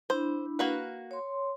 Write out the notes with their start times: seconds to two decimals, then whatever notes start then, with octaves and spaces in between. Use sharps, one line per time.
0.10 D4 E4 C5 B5
0.59 A#3 F#4 B4
1.11 C#5 C6